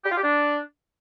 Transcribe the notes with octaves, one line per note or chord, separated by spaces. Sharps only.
G4
F4
G4
D4